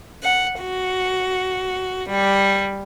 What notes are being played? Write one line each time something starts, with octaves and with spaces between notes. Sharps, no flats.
F#5
F#4
G3